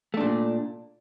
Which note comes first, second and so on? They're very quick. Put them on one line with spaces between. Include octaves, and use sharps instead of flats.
A3 D4 A#2